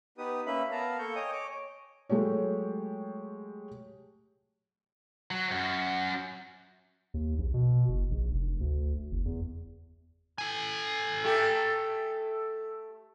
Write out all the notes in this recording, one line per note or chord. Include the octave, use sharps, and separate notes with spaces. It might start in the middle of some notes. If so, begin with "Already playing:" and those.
B3 D#4 G4 B4 D#6
A#3 C#4 B4 E5 B5
B3 A#4 F5 A5 A#5
A#3 A4 C#6 G6
C#5 D#5 G5 G#5 D#6
C#5 D6
F#3 G#3 A3 G4 C#5
F#3
F#2
D#2
A#1
B2
F#1
A#1
F1
D2
F#1
E2
A4 G#5
A3 G4